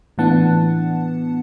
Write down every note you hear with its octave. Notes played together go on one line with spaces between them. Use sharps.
A2 E3 B3 D4 F#5 A5